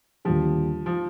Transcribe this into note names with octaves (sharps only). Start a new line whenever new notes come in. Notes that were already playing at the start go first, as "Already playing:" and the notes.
D#2 D3 F3 G3
F3